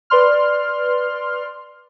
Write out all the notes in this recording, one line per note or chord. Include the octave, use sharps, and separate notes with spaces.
B4 D5 C6 F6